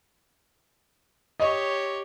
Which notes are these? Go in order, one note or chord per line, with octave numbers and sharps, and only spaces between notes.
G4 C#5 D#5